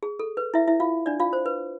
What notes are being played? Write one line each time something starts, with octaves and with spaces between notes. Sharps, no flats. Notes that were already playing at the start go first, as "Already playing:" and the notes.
G#4
A4
B4
E4 E5
E4 E5
F4 F5
D4 D5
F4 F5
C5
B4